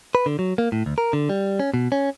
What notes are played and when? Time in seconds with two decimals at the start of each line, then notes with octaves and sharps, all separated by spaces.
0.15 B4
0.26 D3
0.39 F#3
0.58 A#3
0.72 A2
0.86 D2
0.98 A#4
1.13 D3
1.29 G3
1.60 C#4
1.74 B2
1.92 C#4